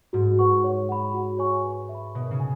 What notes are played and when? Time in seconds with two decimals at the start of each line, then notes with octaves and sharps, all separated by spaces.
0.13 G#2 F#4
0.39 B4 F#5 C#6
0.64 C#5
0.89 F#5 B5
1.14 F#4
1.39 C#5 G#5 C#6
1.64 B4
1.89 E5
1.95 B5
2.14 B2 C#5
2.31 C#3
2.40 G#5